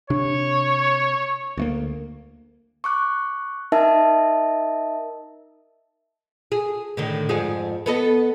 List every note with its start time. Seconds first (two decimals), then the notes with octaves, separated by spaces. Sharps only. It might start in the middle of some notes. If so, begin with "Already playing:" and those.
0.10 C3 D4 C#5
1.57 D2 A3 A#3
2.84 C#6 D6 F#6
3.72 D#4 A#4 D#5 E5 A5
6.52 G#4
6.97 A2 D3 D#3
7.29 F2 G#2 G#4
7.86 B3 A4 D#5